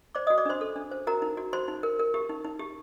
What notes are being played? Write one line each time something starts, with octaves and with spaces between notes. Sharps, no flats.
C5 D5 D6
F#4 D#5 D#6
D5 D6
D4 C5 C6
A4
D4
C5
F#4 A#4 A#5
D#4
F#4
F#4 C5 C6
D#4
A#4
A#4
G4
D#4
D#4
G4